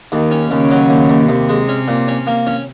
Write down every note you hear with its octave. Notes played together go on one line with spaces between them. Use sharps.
D#2 D#3
C#4
D#2 C#3
F#3
D#2
D#2
D#2 C3
G#3
C#4
A#2
C#4
A#3
C#4